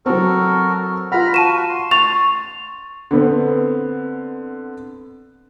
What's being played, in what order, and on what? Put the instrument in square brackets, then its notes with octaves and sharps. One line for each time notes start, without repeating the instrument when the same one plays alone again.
[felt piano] F#3 C4 [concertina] F#4 A4 A#4
[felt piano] F4 F#5 [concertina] A#5 B5 F6
[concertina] F#4 [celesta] A5 D#7 E7
[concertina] C6
[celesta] C#6 F7 [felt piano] A6
[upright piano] D3 B3 C4